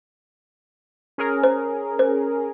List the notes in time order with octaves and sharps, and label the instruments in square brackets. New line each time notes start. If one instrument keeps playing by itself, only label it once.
[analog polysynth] C#4 G#4 A#4
[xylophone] C5
C5